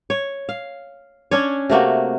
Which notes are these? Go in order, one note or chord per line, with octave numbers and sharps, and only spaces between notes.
C#5
F5
C#4 D4 C#5
C3 A3 A#3 F#4